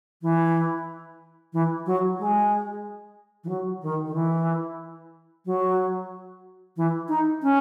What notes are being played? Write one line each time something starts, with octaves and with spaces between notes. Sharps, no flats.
E3
E3
F#3
G#3
E3
F#3
D#3
D#3
E3
F#3
E3
D#4
C#4